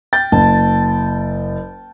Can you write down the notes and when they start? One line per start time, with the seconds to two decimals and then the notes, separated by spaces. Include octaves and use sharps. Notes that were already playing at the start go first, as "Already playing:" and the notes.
0.13 G5 A6
0.32 F#1 A5